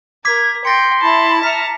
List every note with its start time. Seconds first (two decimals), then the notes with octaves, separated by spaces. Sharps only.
0.25 A#4 D6 G#6 B6
0.65 G5 C6 A6 A#6 C#7
1.02 E4 A5 B5
1.43 E5 A#5 F6 B6 C#7